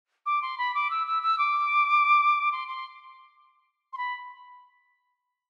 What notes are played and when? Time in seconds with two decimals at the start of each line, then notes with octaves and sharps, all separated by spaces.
0.26 D6
0.42 C6
0.58 B5
0.75 D6
0.90 E6
1.07 E6
1.23 E6
1.38 D6
2.52 C6
2.68 C6
3.93 C6
3.98 B5